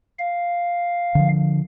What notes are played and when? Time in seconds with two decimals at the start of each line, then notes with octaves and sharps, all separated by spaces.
0.19 F5
1.15 D3 F3